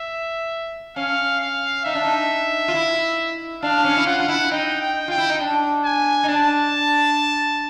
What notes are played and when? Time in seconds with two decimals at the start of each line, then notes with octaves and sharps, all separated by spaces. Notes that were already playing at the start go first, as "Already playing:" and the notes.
Already playing: E5
0.96 C#4 F5
1.40 F5
1.85 D#4 E5
1.95 D4
2.04 D#4
2.68 F4
2.74 E4
3.62 D4 F5
3.84 C#4
3.97 E4
4.06 F4 F#5
4.20 F4
4.28 E4
4.51 D#4 G5
4.81 G5
5.08 F4 G5
5.18 E4
5.29 D#4
5.40 D4
5.84 G#5
6.23 D#4
6.28 D4 A5